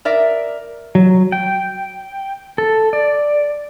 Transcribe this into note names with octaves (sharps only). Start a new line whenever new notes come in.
A#4 D5 E5
F#3
G5
A4
D5